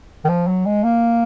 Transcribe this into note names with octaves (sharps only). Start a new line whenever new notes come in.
D#3
F3
F#3
G#3
A#3